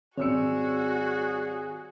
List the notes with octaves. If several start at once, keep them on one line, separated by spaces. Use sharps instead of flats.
G#1 G3 C4 F#4 G#4 C#5 E6 C#7